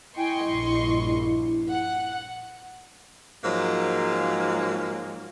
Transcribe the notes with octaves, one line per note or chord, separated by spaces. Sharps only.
E4 D#5 G5 G#5 C6 C#6
A#1 G2
F#5
G#2 F3 F#3 G#3 A#3